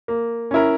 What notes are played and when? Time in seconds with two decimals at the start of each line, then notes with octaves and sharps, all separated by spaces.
0.08 A#3
0.51 C#4 E4 A#4